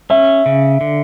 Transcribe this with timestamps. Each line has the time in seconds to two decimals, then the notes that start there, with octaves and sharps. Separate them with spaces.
0.10 C#4 E5
0.46 C#3
0.81 D3